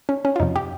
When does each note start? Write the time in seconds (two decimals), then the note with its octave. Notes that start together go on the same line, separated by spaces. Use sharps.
0.09 C#4
0.25 C#4
0.36 F4
0.40 F2 C3 F3 D#4
0.56 G4